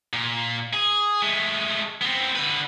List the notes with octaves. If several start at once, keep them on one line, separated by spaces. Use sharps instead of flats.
A#2
G#4
G#3 A3
B3 C4
D3 B4